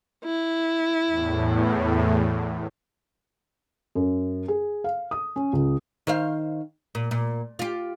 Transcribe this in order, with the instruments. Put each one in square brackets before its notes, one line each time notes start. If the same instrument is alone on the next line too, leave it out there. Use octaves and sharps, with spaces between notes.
[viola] E4
[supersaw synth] E2 A2
[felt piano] F#2
G#4
F5
D#6
C#4
C#2
[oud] D#3 C5 F5
A#2
A#2
F4 G4